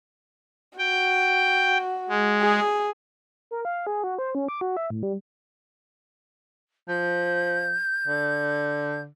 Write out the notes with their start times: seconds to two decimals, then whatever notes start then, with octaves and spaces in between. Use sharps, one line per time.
0.78 F#4 G5
2.09 G#3
2.42 G#4
3.51 A#4
3.65 F5
3.87 G#4
4.04 F#4
4.19 C5
4.35 C#4
4.48 D6
4.61 F#4
4.77 E5
4.90 A2
5.03 G3
6.88 F3 G6
8.07 D3